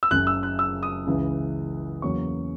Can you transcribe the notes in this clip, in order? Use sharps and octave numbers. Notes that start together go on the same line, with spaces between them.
E6
F#1 F#2 C#3 F#6
E6
F#6
E6
D#6
C#2 C#3 E3
E2 C#3 F#3 A#3 C#4 C#6